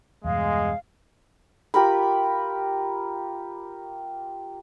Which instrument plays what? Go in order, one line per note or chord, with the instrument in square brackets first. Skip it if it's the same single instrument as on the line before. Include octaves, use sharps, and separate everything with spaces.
[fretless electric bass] E2 G2 B2 [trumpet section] G#3 [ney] F5
[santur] F4 G4 A#4 B5